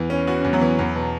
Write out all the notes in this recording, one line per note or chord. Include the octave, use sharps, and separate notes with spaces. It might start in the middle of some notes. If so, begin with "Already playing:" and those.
Already playing: E2 E3
C#4
B3 F#4
E2 C#4
F#3 B3
E3
E2
B2